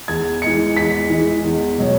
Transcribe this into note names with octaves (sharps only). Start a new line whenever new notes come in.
E2 G#6
E3 G#3 C#7
E2 B6
E3 G#3
E2
B2 F#3